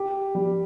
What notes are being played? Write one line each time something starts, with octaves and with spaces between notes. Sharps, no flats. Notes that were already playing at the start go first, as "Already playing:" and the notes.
Already playing: G4
G3